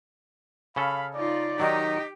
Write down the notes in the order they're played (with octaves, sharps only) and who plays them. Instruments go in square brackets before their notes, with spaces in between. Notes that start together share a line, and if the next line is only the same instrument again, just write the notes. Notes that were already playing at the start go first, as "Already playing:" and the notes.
[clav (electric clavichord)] C#3 C#4 A4 [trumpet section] F5 B5
[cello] D#4 F4 [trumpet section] D5
[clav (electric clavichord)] D#3 F#3 [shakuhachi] D#4 [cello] G4